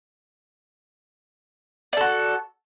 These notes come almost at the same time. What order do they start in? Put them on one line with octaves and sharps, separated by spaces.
D5 A4 F#4